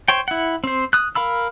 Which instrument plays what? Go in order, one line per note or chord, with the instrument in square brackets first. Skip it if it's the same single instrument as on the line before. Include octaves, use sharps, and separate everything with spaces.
[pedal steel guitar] C5 C#5 G5
E4 F#5
C4 C5
D#6 F#6
A#4 F5 B5 E6